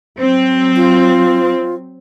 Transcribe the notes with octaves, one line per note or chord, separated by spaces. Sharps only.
F#3 C4
F4